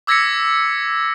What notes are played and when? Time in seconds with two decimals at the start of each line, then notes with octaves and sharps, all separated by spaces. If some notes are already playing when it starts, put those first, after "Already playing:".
0.07 D6 E6 G#6 A#6 B6 C#7